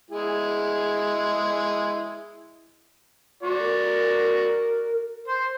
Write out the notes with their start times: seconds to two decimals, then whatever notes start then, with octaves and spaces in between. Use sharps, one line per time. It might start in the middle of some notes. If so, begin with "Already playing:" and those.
0.11 G#3 E4 G#4
3.43 F#4 D5
3.60 A#4
5.28 C5